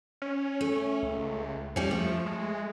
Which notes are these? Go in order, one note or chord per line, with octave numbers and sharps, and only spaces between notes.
C#4
A3
C#2
F2 G3 C#4
F3 A3
G#3